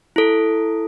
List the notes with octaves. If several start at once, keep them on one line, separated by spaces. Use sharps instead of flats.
E4 A4